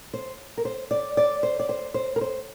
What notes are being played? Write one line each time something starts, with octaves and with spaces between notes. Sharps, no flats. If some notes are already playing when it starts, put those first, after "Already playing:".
C5
A#4
C5
D5
D5
C5
D5
C5
C5
A#4
C5